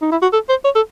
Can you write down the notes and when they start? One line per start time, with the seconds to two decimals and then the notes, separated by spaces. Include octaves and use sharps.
0.02 D#4
0.12 E4
0.22 F#4
0.33 A4
0.49 C5
0.65 C#5
0.75 A4